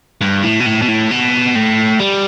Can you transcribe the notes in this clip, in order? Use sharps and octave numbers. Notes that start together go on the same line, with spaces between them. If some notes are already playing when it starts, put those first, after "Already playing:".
G2
A2
B2
A2
B2
A2
B2
A2
G3